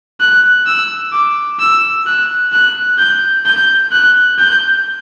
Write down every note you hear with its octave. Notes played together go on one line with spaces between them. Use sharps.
F#6
E6
D6
E6
F#6
F#6
G6
G6
F#6
G6